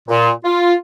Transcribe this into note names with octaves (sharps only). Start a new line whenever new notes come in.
A#2
F4